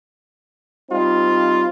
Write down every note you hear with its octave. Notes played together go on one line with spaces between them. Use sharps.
G3 C4 D#4 F4